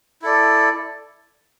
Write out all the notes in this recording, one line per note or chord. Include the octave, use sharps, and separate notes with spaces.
E4 A4 D5